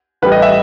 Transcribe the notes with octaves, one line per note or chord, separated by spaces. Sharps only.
A1 A2 G3 B4
D#5
E5